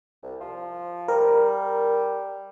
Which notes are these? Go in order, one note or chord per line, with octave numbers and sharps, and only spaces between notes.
C2
F3
G3 A#4